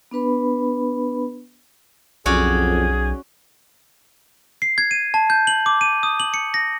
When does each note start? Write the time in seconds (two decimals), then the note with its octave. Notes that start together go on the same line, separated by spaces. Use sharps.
0.11 B3 D4 B4 B5
2.26 B1 F2 C#4 F#4 G#4 D5
4.62 C7
4.78 G#6
4.91 D#7
5.14 A5
5.30 G6
5.47 F#7
5.66 D6
5.81 D#7
6.03 D#6
6.20 F#7
6.34 C#7
6.54 A#6